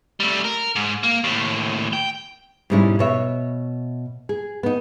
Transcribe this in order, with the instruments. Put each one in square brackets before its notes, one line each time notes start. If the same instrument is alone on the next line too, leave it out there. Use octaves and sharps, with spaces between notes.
[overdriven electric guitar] G3 A3
A#4
G#2
A#3
D#2 A2
G5
[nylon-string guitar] G#2 B2 G3 G#3 C#4 E4
B2 C#5 E5
G#4
B3 D#4